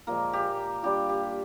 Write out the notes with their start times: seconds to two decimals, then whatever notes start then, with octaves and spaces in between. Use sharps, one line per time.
0.07 A#2 F3 G#3 A#3 A#4
0.33 G4
0.83 G3 D4 F4 G4
1.09 G4